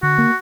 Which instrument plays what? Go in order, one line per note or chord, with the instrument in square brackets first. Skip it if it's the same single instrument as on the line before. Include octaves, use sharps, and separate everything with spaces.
[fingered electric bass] D3 [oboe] F#4
[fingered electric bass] A#3